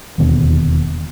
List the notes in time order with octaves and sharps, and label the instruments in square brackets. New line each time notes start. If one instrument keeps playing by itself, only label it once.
[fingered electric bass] E1 D#2 B2 D3